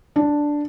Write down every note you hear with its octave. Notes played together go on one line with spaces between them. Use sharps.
D4